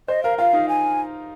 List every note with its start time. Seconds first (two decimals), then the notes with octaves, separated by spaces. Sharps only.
0.08 C5 D#5
0.23 A#4 F5
0.38 F4 F5
0.53 D#4
0.69 G#5